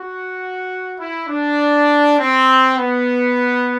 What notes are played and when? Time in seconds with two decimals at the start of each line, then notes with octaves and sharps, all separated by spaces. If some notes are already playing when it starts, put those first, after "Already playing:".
Already playing: F#4
1.00 E4
1.29 D4
2.19 C4
2.78 B3